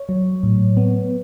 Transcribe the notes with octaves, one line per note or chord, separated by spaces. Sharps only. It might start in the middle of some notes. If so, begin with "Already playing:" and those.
Already playing: C#5
F#3
A2
B3